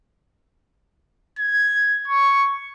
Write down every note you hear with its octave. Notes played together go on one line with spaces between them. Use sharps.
G#6
C#6